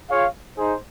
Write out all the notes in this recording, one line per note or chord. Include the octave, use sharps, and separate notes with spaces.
F4 G#4 C#5 F5
D#4 G#4 C5